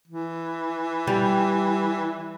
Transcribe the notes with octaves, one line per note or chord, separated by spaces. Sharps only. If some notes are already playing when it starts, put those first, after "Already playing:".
E3
G3